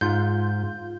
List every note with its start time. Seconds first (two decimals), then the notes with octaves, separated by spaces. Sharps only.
0.01 G#2 F4 G6